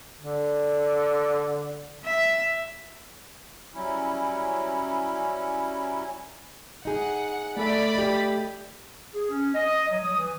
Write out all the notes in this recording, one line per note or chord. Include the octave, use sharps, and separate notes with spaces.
D3
E5
F#3 G3 C#4 E4
D#4 G#4 F#5
A3 A4 D5 E5 B5
G4 D#5
G#4
C#4
D#5
F#3
D#6
E3